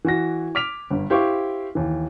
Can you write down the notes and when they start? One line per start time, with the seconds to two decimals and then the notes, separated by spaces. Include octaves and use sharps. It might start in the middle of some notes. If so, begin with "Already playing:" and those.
0.05 E3 F#4 A#6
0.55 D6 F6 B6 D7 F7
0.90 G1 G2
1.10 E4 G4 C5 F5 C#6 D6
1.75 D#2 E3